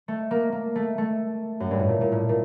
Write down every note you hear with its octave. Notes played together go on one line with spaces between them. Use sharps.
A3
A#3
A#3
A3
A3
F#2
G2
A2
A#2
A#2
A2
A#2